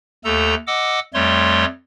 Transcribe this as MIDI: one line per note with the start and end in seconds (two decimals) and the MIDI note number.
0.25 0.55 39
0.25 0.55 57
0.25 0.55 69
0.25 0.55 82
0.67 0.99 75
0.67 0.99 78
0.67 0.99 86
0.67 0.99 88
1.14 1.65 41
1.14 1.65 55
1.14 1.65 57
1.14 1.65 73
1.14 1.65 84